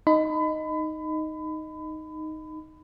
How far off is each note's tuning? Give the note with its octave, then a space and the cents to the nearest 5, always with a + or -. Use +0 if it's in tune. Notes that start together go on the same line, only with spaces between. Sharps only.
D#4 +0 B5 +30